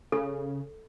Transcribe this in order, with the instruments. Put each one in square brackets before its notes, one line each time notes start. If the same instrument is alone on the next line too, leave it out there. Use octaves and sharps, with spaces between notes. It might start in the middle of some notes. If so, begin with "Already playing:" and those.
[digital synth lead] C#3 [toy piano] A4